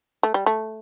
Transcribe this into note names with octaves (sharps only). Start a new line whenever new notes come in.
A3
G3
A3